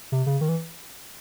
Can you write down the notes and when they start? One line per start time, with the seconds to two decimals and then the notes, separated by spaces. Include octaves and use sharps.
0.12 C3
0.26 C#3
0.41 D#3
0.49 E3